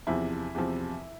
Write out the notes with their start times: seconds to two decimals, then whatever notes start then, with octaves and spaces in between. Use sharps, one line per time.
0.07 E2 C3 F3 E4
0.55 E2 C3 F3